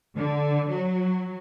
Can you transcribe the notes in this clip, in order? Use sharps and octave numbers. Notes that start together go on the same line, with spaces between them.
D3
F#3